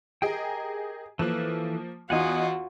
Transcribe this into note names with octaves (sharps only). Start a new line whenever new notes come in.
G4 G#4 A#4 D#5 G5
E3 F3 A#3 A4 B4
E2 D#4 F4 F#4 F#5 G#5 D#6